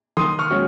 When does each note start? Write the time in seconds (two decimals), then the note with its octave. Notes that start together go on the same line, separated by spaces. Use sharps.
0.17 D#3 C6 D#6
0.39 C#6 F6
0.50 G#3 C#4 F#4